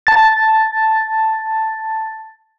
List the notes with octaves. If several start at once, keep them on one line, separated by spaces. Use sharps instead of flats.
A5 A6